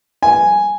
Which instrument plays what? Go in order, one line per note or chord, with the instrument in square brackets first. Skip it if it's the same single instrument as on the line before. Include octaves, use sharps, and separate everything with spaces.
[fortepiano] G#5